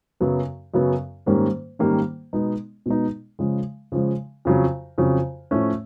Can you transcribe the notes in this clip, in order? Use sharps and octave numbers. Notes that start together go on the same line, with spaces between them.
F#2 C#3 F#3 B3
F#2 C#3 F#3 B3
G#2 D#3 G3 A#3 C#4
G#2 D#3 G3 A#3 C#4
B2 G#3 B3 D#4
B2 G#3 B3 D#4
C#3 F3 G#3
C#3 F3 G#3
F2 C#3 F#3
F2 C#3 F#3
A2 F3 A3 C#4